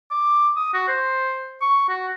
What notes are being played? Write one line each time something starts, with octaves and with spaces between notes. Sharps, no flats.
D6
D#6
F#4
C5
C#6
F#4